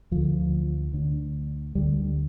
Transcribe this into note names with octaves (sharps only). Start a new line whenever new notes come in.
D2 D3 F3
D2 D3
D2 D3 G3